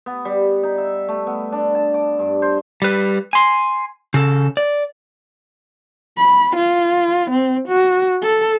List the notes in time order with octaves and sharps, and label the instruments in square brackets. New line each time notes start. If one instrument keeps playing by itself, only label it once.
[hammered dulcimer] B3
G3
D#4
E5
A3
B3
D4
A5
D6
G2
C5
[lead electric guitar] G3 B4
G#5 C6
C#3 A4
D5
[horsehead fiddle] B5
F4
C4
F#4
A4